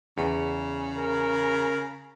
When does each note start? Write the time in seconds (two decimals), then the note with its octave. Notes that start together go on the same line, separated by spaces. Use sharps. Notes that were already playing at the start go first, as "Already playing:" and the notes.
0.18 E2 C#3
0.98 A#4